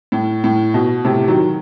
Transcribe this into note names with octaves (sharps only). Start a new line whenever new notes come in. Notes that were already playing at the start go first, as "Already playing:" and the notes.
A2
A2
B2
A2 C3
D#3 F#3